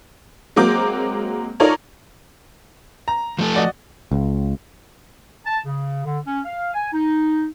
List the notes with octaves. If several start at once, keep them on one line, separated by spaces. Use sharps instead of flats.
F#3 G#3 A#3 C4 D6 G6
D#4 F4 A4 A#4 C#5 D5
A#5
F3 A3 A4
F#4 D5 D#5
C#2
A5
C#3
D3
C#4
F5
G#5
D#4